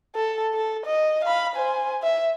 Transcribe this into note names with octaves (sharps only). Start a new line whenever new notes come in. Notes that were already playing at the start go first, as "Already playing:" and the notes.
A4
A4
D#5
F5 B5
C5 G#5
E5